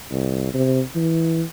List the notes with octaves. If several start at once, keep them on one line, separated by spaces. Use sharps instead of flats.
C2
C3
E3